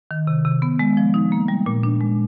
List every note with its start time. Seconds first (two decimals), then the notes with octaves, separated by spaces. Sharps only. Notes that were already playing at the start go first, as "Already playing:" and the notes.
0.11 D#3
0.27 C3
0.45 C3
0.62 B3
0.79 G#3
0.97 F3
1.14 D#4
1.32 A#3
1.48 G3
1.66 A#2
1.83 D4
2.01 G#3